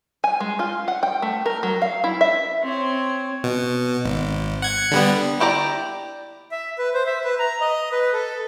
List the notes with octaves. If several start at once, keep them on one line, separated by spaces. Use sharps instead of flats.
G#5
G#3
F4
F#5
G5
A3
A#4
F#3
F5
E4
E5
C4 C#5
B2
G#1
F#5 G#6
D3 G3 B3
E4 G4 D5 A#5
E5
B4
C5
E5
B4
A#5
D#5
B4
A4